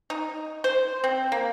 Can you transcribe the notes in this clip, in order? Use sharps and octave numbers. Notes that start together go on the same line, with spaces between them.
D#4
C5
C4
A#3